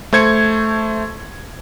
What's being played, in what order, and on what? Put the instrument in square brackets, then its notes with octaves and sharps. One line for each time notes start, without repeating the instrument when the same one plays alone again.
[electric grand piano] A3 C5 G#6 C#7